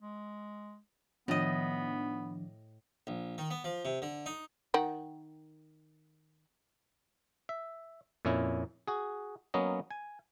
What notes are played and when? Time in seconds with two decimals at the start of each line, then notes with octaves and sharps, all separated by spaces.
0.01 G#3
1.28 A2 D#3 F3 B3 D4 D#5
3.07 A#1
3.38 D#3
3.51 B3
3.64 F3
3.85 C3
4.02 D3
4.26 D#4
4.74 D#3 F#5 G5
7.49 E5
8.25 F2 A#2 C#4 E4 C#5
8.88 F#4 G#4
9.54 F#3 A#3 B3 C#4 D#5
9.91 G#5